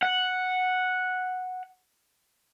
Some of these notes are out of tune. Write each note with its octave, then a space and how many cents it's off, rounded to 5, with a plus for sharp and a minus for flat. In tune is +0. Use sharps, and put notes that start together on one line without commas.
F#5 -5